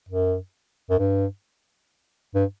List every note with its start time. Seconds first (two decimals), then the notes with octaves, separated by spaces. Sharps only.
0.09 F#2
0.90 F#2
0.98 G2
2.35 G2